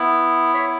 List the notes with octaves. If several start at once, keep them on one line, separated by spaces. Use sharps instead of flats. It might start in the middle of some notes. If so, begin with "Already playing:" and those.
Already playing: B3 E4
C#5 E5